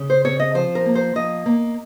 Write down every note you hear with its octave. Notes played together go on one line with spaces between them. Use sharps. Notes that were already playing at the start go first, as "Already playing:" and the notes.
Already playing: C#3
C5
C4 C#5
D#5
F3 C5
A#4
A#3
C5
F3 D#5
A#3